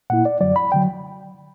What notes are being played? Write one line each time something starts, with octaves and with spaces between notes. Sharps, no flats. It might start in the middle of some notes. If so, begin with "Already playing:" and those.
A#2 A#3 E4 F#5
D5
F#2 D3 F#3 D5
B5
D3 F#3 G5